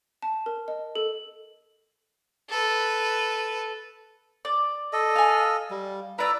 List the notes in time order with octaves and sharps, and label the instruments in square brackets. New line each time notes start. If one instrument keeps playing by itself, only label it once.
[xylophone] A5
A#4
D#5
A4
[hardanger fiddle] A4 B4
[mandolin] D5
[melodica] A4 D#5
[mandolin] F5 G#5
[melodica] G3
[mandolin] E4 D5 E6 [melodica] B4 A#5